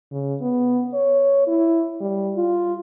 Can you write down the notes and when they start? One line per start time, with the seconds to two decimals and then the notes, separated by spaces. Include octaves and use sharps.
0.12 C#3
0.41 B3
0.94 C#5
1.47 E4
2.01 G3
2.36 F4